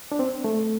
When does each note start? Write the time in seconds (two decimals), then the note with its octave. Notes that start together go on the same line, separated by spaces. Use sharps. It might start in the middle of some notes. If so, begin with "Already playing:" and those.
0.12 D4
0.19 C4
0.44 A3